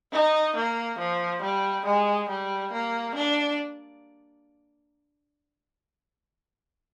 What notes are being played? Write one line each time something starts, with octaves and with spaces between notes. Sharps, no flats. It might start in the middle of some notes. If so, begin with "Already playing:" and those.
D#4
A#3
F3
G3
G#3
G3
A#3
D4